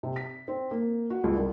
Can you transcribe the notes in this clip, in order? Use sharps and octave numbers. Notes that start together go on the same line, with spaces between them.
C3
B6
C4
A#3
F#4
C#2
C2